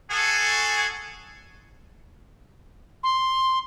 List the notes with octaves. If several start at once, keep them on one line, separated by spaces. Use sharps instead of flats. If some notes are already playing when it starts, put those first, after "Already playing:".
F#4 G#4 A4 G#5 C#6
C6